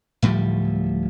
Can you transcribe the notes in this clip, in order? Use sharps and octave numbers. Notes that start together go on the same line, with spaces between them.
D1 A2 F3 G3